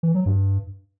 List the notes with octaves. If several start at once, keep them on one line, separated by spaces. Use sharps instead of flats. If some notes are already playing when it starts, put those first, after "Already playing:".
E3
F#3
G2